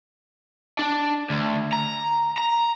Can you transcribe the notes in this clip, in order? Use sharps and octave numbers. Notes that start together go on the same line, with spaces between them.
D4
D2
A#5
A#5